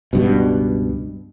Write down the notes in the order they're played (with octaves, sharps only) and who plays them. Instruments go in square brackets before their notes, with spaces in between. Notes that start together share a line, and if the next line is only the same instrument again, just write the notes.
[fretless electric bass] C#2 G2 B2